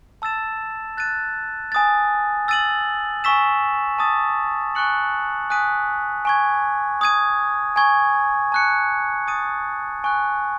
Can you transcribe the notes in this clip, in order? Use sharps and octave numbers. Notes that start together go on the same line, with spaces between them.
A5 E6 A6 E7
F#6 A6 D#7
G#5 D#6 A6
E6 A6 D#7 F#7
G#5 C#6 E6 B6 E7
A5 D#6 A6
G#5 C#6 F#6 C#7 F#7
G#5 D#6 F#6 B6 D#7
G#5 C#6 G#6
D#6 G#6 D#7
G#5 C#6 G#6
A5 C#6 F#6 C#7
D#6 A6 D#7
G#5 C#6 F#6